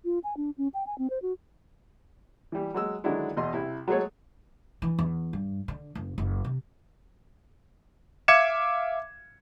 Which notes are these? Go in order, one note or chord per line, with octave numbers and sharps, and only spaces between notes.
F4
G#5
D4
C#4
G5
G#5
C4
C5
F#4
E3 G3
F#3 G#3 E6
D3 D#3 F#3 G#3 D4 E4
E2 B2 D#5 C6
C2 E4
F#3 G#3 A3 G#4 A4 C#5
E3
E2
G2
D3
F#1
F#1
C3
E5 F5 D6 G#6 C#7 E7